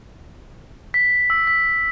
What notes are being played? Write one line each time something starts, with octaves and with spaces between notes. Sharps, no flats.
B6
E6
B6